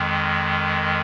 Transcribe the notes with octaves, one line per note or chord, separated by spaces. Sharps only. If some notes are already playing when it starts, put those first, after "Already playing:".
Already playing: F2 D#3 G#3